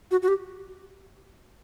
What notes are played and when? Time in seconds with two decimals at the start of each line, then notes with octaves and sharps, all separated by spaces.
0.11 F#4
0.22 F#4
0.28 G4